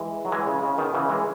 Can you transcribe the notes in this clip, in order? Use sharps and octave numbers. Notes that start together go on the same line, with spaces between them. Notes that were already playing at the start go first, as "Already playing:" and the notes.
Already playing: E3 G#3
F#3
E3 G#3
C#3
C#3
B2 D#3
C#3 E3
E3 G#3